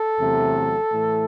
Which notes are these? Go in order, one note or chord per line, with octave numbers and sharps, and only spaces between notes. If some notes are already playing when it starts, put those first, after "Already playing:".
Already playing: A4
E2 C3 F#3 A3
A2 E3 A3